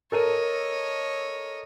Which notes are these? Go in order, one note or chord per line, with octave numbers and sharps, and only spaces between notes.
A4 A#4 C#5 D#5 D#7